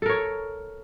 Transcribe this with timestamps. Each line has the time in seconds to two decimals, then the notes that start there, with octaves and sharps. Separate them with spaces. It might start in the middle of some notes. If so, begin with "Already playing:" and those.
0.02 A4
0.06 A#4
0.09 C#5